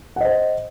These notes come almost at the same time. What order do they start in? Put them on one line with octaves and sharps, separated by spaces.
F#5 D#5 C5